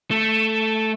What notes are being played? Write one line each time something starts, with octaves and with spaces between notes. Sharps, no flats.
A3